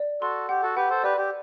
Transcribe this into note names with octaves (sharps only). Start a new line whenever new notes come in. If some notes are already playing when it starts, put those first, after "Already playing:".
Already playing: D5
F#4 A4 C6
G4 F#5
F#4 A4
G4 B4 F#5
A4 C5
G4 B4 D5
G4